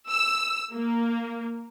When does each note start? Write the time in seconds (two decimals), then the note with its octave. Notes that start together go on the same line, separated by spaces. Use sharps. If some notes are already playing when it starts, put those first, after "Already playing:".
0.10 E6
0.73 A#3